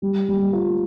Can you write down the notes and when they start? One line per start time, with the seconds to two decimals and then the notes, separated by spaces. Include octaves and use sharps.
0.02 G3
0.28 G3
0.53 F4